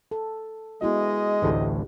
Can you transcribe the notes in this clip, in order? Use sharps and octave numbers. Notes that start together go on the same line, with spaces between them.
A4
G#3 B3 E4 F#4 D#5
A1 D2 A2 G4